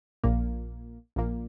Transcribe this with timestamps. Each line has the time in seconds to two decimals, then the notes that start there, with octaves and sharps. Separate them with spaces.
0.24 A#1 A#2 A#3
1.16 A#1 A#2 A#3